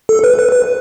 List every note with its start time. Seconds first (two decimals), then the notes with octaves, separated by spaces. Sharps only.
0.09 A4
0.24 B4
0.38 B4
0.52 B4